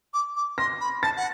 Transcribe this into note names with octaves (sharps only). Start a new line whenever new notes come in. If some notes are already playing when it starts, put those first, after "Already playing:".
D6
D6
C6 A#6
B5
A5 A6
F#5